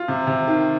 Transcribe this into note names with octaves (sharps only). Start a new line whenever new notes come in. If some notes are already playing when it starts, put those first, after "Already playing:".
Already playing: F4
C3
C3
D#3